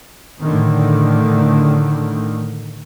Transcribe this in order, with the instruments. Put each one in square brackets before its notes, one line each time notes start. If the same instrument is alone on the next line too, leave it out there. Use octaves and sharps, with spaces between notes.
[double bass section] A2 D3 D#3